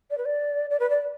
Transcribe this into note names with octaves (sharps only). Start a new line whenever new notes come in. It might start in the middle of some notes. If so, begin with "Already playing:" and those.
D5
B4
D5
D5
B4
D5